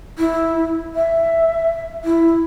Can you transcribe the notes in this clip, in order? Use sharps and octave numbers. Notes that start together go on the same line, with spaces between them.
E4
E5
E4